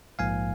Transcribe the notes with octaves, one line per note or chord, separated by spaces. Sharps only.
A#1 G#2 F3 A#3 F5 G#5